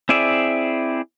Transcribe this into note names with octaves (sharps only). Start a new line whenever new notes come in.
C4 E4 G#4 D5 E5